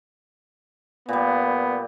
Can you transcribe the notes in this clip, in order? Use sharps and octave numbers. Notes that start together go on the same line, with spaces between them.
A#2 G3 B3